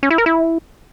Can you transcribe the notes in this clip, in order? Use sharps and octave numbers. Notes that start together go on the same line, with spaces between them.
C#4
E4
A#4
E4